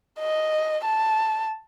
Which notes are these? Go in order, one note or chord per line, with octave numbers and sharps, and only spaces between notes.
D#5
A5